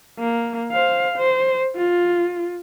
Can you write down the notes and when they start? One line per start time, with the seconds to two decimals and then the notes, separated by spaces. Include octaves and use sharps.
0.19 A#3
0.72 C5 F5
1.16 C5
1.77 F4